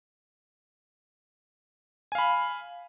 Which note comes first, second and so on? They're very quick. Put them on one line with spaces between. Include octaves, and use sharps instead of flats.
G#5 F5 B5